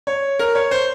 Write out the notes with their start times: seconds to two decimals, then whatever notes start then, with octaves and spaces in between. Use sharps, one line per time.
0.07 C#5
0.39 A#4
0.55 C#5
0.71 C5